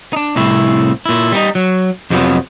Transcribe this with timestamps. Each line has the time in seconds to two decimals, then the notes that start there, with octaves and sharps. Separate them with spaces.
0.13 D4 D#4
0.36 C2 A2 C4 E4
1.06 A#2 E4
1.32 G3 B3 D#4
1.55 F#3
2.10 F2 C3 F3 F#3 B3